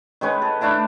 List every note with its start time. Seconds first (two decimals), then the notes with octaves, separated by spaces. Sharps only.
0.21 D#3 G#3 C#4 B4
0.42 A4
0.61 A3 D4 E4 A#5